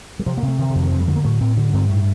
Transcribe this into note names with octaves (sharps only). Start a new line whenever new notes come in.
G3
C3 F3
A#3
C3
A3
C3 D#3
D3
F2
D#3
G2 F3
G3
D3 A3
A#3
A2 A3
A2 C4
D3 D4
G2 C4
A2 A3